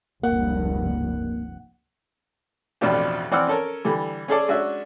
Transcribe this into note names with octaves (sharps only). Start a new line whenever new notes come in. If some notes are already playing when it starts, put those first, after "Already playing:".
F1 C#2 G2 A#3 F#5
A1 F2 B2 F3 D4 G4
E3 C4 D5 F#5 E6 F6
C#4 A4 A#4
D3 E3 G3
C#4 G#4 A4 D5
G#3 C#4 D4 F#4 E5